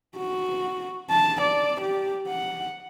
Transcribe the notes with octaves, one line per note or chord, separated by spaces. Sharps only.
F#4
A5
D5
G4
F#5